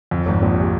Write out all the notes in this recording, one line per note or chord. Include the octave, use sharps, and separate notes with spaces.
F2
G#1 G#2
A#1 A#2
C3